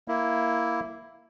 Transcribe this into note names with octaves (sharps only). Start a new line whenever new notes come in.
A#3 E4